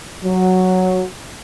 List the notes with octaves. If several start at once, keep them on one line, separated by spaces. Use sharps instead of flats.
F#3